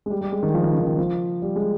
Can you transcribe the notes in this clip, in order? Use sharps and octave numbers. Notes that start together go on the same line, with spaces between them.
G#3
G3
G3
G#3
D#3
F3
D#3
C#3
D#3
F3
G3
G#3